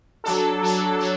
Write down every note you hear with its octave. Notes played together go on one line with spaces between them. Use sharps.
F#3 D4 A4
F#3 D4 A4
F#3 D4 A4